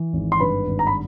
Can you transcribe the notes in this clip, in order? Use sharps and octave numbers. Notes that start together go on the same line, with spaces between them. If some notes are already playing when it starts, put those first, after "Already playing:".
Already playing: E3
G#1
C6
G2 B4 B5
G#1
A#5
B5